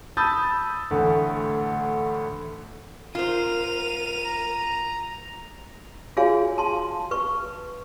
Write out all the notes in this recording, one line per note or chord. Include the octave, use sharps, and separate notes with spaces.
A5 B5 D#6 E6 G6 A6
D2 A2 E3
F4 A#4 C5 D#7 F7
A#5
F4 F#4 G#4 C#5 F5 G#5
A5 C6
B4 C#6